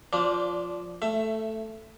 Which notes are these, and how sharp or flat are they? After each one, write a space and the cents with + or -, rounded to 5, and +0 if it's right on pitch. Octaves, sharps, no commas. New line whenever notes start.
F3 +0 D4 -25 D5 -5
A3 +0 E5 +20